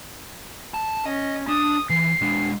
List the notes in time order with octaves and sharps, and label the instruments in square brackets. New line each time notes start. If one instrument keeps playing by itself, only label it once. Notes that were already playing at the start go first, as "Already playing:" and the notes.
[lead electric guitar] A5
[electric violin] C#4 [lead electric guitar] D#5
[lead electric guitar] D4 [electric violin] D#6
[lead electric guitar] E3 [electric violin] C7
[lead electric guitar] G#3 D4